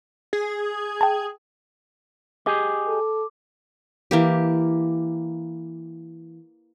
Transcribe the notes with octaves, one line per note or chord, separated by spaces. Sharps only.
G#4
G5 A5
G4 G#4 D#5 D6
A4
E3 A#3 G4